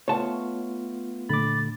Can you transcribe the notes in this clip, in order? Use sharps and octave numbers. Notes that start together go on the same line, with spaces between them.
A3 B3 F4 C#5 A5
A#2 D3 A3 B5 D6 A6